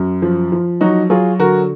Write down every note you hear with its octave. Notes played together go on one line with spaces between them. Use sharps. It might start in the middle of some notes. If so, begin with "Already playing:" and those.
Already playing: F#2
F3
F3
F#3 D#4 F#4
F#3 F4 G#4
D3 F#4 A#4